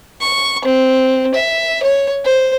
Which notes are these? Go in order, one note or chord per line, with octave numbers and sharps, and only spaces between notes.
C#6
C4
E5
C#5
C5